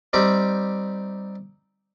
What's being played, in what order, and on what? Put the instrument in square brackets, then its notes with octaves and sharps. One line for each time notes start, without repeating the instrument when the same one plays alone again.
[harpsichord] G3 C4 D#4 G4